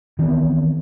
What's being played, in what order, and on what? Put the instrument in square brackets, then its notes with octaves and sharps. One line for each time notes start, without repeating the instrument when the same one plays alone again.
[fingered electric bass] D#3 E3 B3 C4